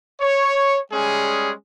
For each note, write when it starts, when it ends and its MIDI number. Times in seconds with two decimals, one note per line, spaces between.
0.21 0.79 73
0.92 1.52 55
0.92 1.52 56
0.92 1.52 61
0.92 1.52 68